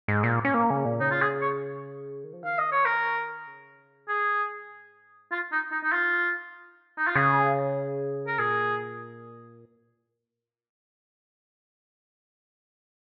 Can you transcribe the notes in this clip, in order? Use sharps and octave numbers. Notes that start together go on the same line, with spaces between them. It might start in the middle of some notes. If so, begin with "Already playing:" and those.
G#2
A#2
C#4
A#3
C#3
A#2
C#3 D#4
F4
G#4
C#5
D#3
F3
D#3 F5
D#5
C#5
A#4
C#3
G#4
G#2
F4
D#4
D#4
D#4
F4
D#4
F4
C#3 G#4
A#4
A#2 G#4